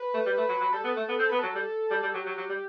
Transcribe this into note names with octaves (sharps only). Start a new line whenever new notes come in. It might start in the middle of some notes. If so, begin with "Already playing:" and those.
Already playing: B4
A3
G3
A3
F#3
F#3
G3 A4
B3
A3
B3
C4 A4
B3 B4
F#3 A4
G3
G3
G3
F#3 G4
F#3
F#3
G3